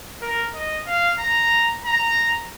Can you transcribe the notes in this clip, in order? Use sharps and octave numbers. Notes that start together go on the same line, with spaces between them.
A#4
D#5
F5
A#5
A#5